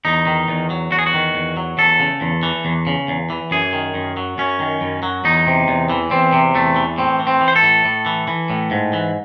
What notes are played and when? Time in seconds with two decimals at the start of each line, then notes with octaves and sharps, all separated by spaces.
0.05 E2 D#4
0.27 D#3
0.48 E2
0.70 F#3
0.91 E2 F#4
0.99 G#4
1.06 F#4
1.14 D#3
1.35 E2
1.57 F#3
1.78 E2 A4
2.00 C#3
2.21 E2
2.43 E3
2.65 E2
2.87 C#3
3.08 E2
3.30 E3
3.51 F#2 G#4
3.73 D#3
3.94 F#2
4.17 F#3
4.38 F#2 C#4
4.60 D#3
4.81 F#2
5.03 F#3
5.25 E2 D#4
5.47 C3
5.68 E2
5.90 E3
6.11 E2 C4
6.33 C3
6.55 E2 A3
6.76 E3
6.98 A2 C4
7.20 E3
7.27 C4
7.41 E3
7.48 C5
7.56 A4
7.63 A2
7.85 A2
8.06 E3
8.28 E3
8.50 A2
8.71 G#2
8.93 E3